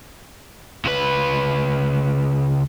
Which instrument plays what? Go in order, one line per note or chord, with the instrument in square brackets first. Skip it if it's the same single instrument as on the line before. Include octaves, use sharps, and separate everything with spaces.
[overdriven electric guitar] C#2 B4